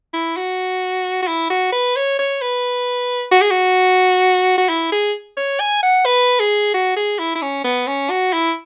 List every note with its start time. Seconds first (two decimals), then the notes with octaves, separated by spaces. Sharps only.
0.14 E4
0.37 F#4
1.22 F#4
1.28 E4
1.50 F#4
1.73 B4
1.96 C#5
2.19 C#5
2.42 B4
3.32 F#4
3.42 G#4
3.51 F#4
4.58 F#4
4.69 E4
4.92 G#4
5.37 C#5
5.60 G#5
5.83 F#5
6.06 B4
6.40 G#4
6.74 F#4
6.96 G#4
7.19 E4
7.35 E4
7.42 C#4
7.64 B3
7.87 C#4
8.10 F#4
8.33 E4